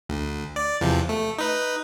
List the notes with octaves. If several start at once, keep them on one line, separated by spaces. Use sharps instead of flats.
D2
D5
E2 C3 F3
A3
D#4 B4